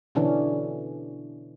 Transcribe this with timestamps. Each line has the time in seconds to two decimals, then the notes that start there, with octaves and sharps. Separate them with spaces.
0.15 B2 D3 E3 C#4 D4